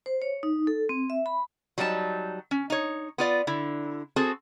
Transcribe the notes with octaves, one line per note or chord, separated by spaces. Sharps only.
C5
C#5
D#4
A4
C4
E5
B5
F#3 G3 D#4 F4 A5
C#4
D#4 C#5
B3 F4 D5
D3 E4
C4 F#4 G#4 A4